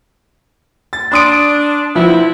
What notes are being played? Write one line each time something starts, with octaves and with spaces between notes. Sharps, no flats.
A6
D4 C6 D#6 D7
F3 B3 C4 E4